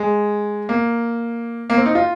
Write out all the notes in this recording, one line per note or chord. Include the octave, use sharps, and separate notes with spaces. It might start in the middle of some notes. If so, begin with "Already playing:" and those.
Already playing: G#3
A#3
A#3
C4
D#4
F4